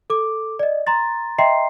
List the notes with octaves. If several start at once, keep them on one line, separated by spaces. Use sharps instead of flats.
A4 D6
D5 D#5
A#5 C6 A6
D#5 E5 G5 A#5 C6 C7